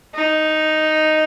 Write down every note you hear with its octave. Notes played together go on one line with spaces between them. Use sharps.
D#4